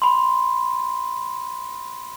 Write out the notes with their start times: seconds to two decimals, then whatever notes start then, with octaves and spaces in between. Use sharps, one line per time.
0.02 B5 C6